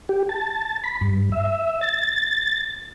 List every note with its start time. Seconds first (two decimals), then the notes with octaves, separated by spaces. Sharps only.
0.09 G4
0.29 A5
0.84 B5
1.01 G2
1.32 E5
1.81 A6